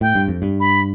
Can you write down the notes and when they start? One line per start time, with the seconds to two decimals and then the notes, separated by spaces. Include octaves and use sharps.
0.01 A2 G5
0.15 G2
0.28 F2
0.42 G2
0.60 B5